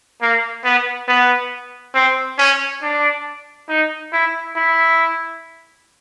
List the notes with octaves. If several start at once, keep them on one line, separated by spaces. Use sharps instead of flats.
A#3
B3
B3
C4
C#4
D4
D#4
E4
E4